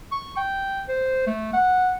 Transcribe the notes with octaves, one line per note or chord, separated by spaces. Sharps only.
C#6
G5
C5
A3
F#5